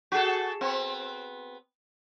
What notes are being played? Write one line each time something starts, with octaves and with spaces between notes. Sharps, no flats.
F#4 G#4 A4
B3 C4